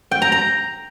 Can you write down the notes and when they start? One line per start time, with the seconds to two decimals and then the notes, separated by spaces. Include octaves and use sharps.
0.11 G5
0.22 A#5
0.32 A#5